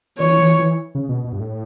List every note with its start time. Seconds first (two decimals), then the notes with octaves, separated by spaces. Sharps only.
0.19 E3 C#5
0.39 E3
0.59 E3
0.95 C#3
1.09 B2
1.24 B2
1.32 G2
1.40 A2